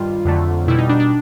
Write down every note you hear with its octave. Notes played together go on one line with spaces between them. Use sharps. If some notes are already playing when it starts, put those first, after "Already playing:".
Already playing: G2 D#3 G3 F4
F2 D3 F#3 A3
B2 G3 E4
D#4
D4
D4